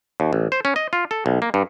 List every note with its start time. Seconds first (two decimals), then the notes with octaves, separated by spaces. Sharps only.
0.20 D#2
0.33 A1
0.52 C5
0.65 C#4
0.76 D#5
0.93 F4
1.11 A4
1.26 B1
1.42 A#3
1.54 G2